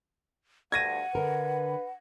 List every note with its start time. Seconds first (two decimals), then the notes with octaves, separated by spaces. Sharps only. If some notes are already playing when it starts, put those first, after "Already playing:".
0.72 D2 G2 F#5 G#6 A#6 D#7
1.15 D3 A#4 B4